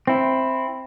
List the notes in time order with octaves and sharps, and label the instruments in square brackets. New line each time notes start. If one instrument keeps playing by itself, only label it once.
[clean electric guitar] C4 E4